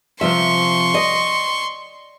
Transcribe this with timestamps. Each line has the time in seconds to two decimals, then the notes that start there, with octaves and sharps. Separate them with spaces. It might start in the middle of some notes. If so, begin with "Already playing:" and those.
0.21 C3 F3 E5 C6 C#6
0.94 D5 D#5